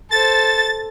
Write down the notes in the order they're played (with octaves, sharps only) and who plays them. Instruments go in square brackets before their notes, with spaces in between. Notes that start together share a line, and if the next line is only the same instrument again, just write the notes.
[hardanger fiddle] A4 C5 [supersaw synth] A6